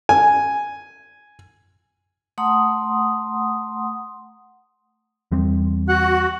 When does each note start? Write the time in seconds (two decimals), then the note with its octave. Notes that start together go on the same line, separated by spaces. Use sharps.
0.09 G#5
2.38 A3 F#5 A#5 C6 D#6
5.32 E2 G3 C4
5.89 F#4 F#5